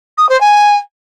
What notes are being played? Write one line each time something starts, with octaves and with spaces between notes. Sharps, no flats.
D#6
C5
G#5